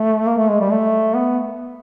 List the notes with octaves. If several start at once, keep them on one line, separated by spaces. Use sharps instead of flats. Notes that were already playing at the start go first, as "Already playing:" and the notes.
Already playing: A3
A#3
A3
G#3
G3
A3
B3